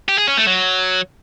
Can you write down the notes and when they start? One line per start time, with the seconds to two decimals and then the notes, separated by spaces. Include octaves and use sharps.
0.09 G4
0.18 G#4
0.28 C#4
0.37 A3
0.47 F#3